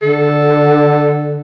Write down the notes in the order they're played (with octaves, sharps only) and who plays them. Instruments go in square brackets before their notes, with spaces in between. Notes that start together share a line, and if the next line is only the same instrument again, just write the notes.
[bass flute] D3 [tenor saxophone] A4